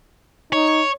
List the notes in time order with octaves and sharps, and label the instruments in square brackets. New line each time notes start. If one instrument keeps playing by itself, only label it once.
[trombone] D#4 [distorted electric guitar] C#5